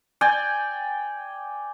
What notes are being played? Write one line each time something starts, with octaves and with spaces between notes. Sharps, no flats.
D5 G5 G#5